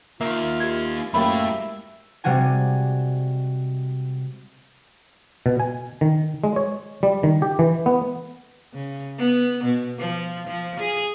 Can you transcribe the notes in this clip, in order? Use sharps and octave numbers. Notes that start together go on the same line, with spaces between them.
A#3 D#4 F4 A#4 E5
G4 G#6
F#2 A3 A#3 E4 G4 E5 B5
C3 G3 G#3 F#4 G#5
B2
G#5
D#3
G#3
C#5
G3
D#3
G4
E3
B3
C#3
B3
B2
F3
F3
G#4